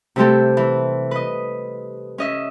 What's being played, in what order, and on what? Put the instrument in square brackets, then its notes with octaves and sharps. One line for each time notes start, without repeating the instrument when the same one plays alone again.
[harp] C3 G3 A3 C4 G4 A4
E3
B4 D#5
C#4 D#5 E5